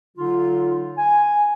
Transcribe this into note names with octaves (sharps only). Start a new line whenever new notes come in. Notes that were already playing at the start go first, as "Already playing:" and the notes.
D3 F#3 D#4 F4
G#5